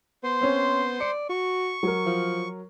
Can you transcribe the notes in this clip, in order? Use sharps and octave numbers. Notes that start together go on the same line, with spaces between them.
B3 C5 C6
C4 C#4
D5 C#7
F#4 C#6
F#3 A#4
F3